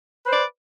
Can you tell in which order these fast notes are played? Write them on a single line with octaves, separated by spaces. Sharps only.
B4 C5 D5